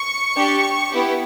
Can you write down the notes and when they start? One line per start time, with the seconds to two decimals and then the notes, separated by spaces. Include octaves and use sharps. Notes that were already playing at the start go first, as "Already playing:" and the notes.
Already playing: C#6
0.37 D4 G4
0.91 B3 E4 G4